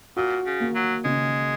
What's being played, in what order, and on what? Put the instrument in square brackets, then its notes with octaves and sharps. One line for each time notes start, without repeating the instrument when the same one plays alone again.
[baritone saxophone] A#2 [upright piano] F#4
[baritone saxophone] C#3
[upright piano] A#3
[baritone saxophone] F#3
[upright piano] C#3 [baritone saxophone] G#3